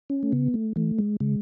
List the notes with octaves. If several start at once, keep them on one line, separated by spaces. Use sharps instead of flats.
C#4
A3
C#3 B3
A3
E3 A3
G#3
C#3 G#3